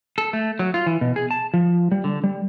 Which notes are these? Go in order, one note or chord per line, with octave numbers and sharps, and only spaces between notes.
A4
A3
F#3
F4
E3
B2
G#4
A5
F3
G3
D3
G3